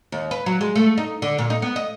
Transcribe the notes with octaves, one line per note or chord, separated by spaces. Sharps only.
D#2
B4
F#3
G#3
A3
D#4
D3
A#2
D#4
B3
D#5